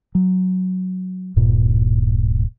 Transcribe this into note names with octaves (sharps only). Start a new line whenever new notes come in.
F#3
D1 G2 A#2